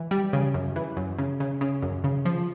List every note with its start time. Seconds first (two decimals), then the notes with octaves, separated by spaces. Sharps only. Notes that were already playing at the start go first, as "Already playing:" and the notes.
Already playing: E3
0.11 G3
0.33 C#3
0.54 F#2
0.76 E3
0.97 F#2
1.18 C#3
1.40 C#3
1.61 C#3
1.82 F#2
2.04 C#3
2.25 F3